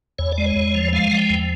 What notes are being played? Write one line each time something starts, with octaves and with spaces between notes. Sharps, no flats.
E2 C#5
D5
G#3
C#5
E2
F3
G#3 F5
F3 F#5
G5
E2